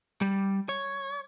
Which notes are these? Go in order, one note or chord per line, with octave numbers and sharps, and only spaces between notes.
G3
C#5